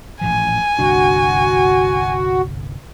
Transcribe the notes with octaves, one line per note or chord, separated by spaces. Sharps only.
A1 A#2 F3 G#5
G1 C2 D4 F#4